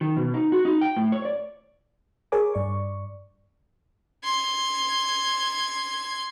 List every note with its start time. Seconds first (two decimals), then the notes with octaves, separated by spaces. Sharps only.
0.01 D#3
0.17 B2
0.34 D#4
0.52 F#4
0.65 D#4
0.81 G5
0.97 A2
1.12 C#5
1.25 D5
2.32 G#4 A#4 C#5 G#5 D6
2.54 G2 D5 C#6
4.24 C6 G#6